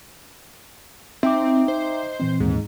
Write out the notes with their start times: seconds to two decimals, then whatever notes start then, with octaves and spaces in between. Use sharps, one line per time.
1.23 C4 D#4 E5 G5 D6
1.68 C5
2.20 A#2 E3 C4
2.40 D#2 G#2